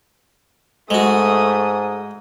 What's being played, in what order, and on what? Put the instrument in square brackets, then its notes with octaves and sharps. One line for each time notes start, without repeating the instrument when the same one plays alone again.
[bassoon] G#2 [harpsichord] G#3 F#4 [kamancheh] A3 D#6